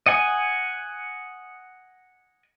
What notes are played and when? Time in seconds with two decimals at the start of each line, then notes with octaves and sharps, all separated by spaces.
0.06 D#5 F#5 G#5